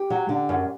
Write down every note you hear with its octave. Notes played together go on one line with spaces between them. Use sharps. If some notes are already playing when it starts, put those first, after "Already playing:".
Already playing: G4
F#3
D3
F#2